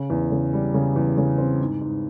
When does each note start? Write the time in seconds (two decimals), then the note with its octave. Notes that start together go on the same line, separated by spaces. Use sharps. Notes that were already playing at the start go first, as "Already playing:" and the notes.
Already playing: C#3
0.10 E2
0.31 C#3
0.53 G3
0.74 C#3
0.96 E2
1.18 C#3
1.38 C4
1.60 G#2
1.81 G#2